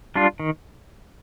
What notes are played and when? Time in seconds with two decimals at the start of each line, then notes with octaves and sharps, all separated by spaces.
0.16 G3 D4 F4
0.40 D#3